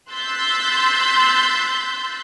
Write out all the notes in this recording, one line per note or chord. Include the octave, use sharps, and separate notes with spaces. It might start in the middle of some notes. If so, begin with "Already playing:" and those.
C6 E6 F#6 G6 A6 B6